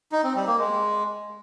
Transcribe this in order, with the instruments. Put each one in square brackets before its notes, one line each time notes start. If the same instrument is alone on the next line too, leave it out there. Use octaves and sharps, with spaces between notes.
[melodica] D#4
C4
G3
A#3
G#3